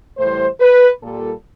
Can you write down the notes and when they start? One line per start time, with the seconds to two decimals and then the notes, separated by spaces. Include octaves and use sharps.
0.18 A2 E3 G3 C5
0.60 B4
1.02 A#2 G3 A4